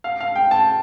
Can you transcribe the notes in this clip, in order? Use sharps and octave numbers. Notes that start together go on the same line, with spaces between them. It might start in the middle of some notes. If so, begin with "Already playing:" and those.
F5
F5
G5
A5